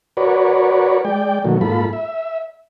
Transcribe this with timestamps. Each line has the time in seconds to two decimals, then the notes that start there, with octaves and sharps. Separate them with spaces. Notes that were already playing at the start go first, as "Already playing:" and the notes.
0.17 F#4 A#4 B4 C#5 D5
1.05 G#3 D5 G5
1.44 B2 D#3 F#3 A3 A#3
1.61 G#2 A#3 F4 A4 B5
1.93 E5